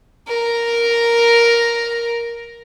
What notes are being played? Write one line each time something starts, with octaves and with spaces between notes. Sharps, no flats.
A#4 A#5